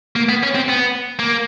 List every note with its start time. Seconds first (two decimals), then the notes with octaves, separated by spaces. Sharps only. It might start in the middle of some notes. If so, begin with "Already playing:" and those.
0.16 A#3
0.29 B3
0.43 C#4
0.55 C4
0.68 B3
1.19 A#3